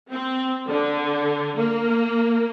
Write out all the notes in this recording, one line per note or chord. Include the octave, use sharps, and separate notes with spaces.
C4
D3
A#3